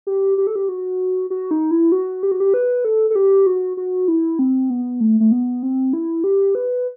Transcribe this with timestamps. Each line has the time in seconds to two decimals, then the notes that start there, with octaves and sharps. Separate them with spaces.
0.07 G4
0.38 G4
0.47 A4
0.56 G4
0.69 F#4
1.30 F#4
1.51 D#4
1.71 E4
1.92 F#4
2.23 G4
2.32 F#4
2.40 G4
2.54 B4
2.85 A4
3.10 A4
3.15 G4
3.46 F#4
3.77 F#4
4.08 E4
4.39 C4
4.70 B3
5.00 A3
5.20 A3
5.32 B3
5.63 C4
5.93 E4
6.24 G4
6.55 B4